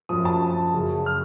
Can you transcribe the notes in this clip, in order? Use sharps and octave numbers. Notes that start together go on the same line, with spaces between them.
F#2 F3 D#6
A5
F#2 C#3 F#3
F6